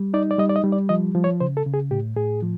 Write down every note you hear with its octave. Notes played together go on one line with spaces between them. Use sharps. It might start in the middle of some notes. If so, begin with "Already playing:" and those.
Already playing: G3
D#4 D5
D5
G3 D#5
D5
D#5
G3
D5
F3 D#5
F3
C#5
C#3 C5
A4
C#3
G#4
A2 G4
A2 G#4
F3